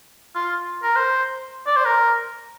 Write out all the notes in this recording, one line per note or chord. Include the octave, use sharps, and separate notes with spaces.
F4
A#4
C5
D5
C5
A#4